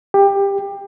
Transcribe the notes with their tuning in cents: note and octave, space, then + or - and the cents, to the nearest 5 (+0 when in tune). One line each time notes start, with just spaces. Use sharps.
G4 +20